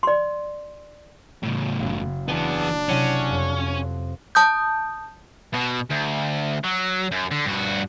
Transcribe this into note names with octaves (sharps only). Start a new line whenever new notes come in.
D5 C6
A2 C#3
F#1
E3 B3 D4 G#5 A5 D7
C3 F#3 C#4 E4
F2
A5 D#6 G6
B2
D2
F#3
F#2
D3
G2 F#4